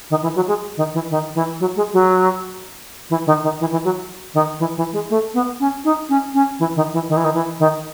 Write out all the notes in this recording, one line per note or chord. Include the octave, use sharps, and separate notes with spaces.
D#3
E3
F#3
G#3
D#3
E3
D#3
E3
F#3
G#3
F#3
E3
D#3
D#3
E3
E3
F#3
D#3
E3
E3
G#3
A3
B3
C#4
D#4
C#4
C#4
E3
D#3
E3
D#3
E3
D#3
E3
D#3